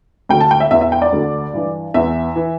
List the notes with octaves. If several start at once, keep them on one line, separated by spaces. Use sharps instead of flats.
D2 D3 G5
A5
G5
E5
E2 E3 E5
E5
G5
D5
D2 D3
G2 E3
E2 E3 E5
E3